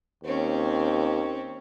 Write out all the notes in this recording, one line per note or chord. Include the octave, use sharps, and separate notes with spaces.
D#2 C4 C#4